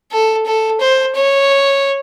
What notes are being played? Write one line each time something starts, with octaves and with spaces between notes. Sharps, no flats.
A4
A4
C5
C#5